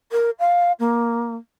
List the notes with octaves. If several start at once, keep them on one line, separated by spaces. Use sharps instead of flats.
A#4
F5
A#3